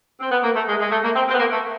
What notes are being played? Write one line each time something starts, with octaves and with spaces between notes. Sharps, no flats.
C4
B3
A#3
A3
G#3
G#3
A3
A#3
C4
C4
B3
A#3
A3